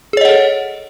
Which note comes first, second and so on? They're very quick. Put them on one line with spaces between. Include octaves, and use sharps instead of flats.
G#4 C#5 D#5 F#5 A4